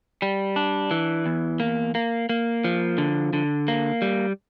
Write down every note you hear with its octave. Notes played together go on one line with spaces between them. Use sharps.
G3
D4
E3
E2
A#3
A#3
A#3
F3
D3
D3
A#3
G3